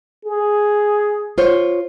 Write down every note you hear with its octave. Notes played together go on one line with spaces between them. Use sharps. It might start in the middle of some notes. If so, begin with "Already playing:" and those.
G#4
F4 C5 C#5